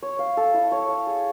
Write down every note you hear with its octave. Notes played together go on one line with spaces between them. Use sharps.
C#5
F5
A4
E4
C#5
F5
G#4